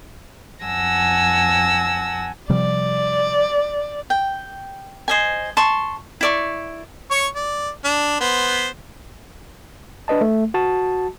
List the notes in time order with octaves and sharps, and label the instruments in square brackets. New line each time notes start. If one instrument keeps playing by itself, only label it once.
[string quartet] F2 F#5 G#5 A5 E6 A#6
[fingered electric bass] C3 F3 G3 [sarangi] D5
[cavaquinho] G5
C5 D#5 G#5
A5 C6 C#6
E4 D5 C#6
[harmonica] C#5 C#6
D5
D4
B3 C5
[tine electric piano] D4 B4 D#5 A5
A3
F#4 A5